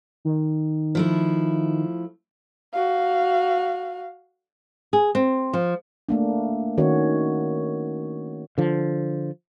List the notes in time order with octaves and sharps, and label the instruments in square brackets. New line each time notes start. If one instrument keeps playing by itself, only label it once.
[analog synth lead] D#3
[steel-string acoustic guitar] F3 A3 E4
[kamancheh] F#4 F5
[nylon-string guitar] G#4
C4
F3
[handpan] A3 A#3 D4
D#3 C#4 F#4 C#5
[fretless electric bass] D3 F3